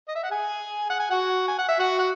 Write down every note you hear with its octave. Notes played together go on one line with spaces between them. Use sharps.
D#5
E5
F#5
G#4 G#5
F#5
G#5
F#4 F#5
G#5
F#5
E5
F#4 F#5
F#5